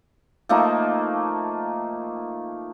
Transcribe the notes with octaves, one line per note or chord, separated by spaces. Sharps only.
F3 A3 A#3 D#4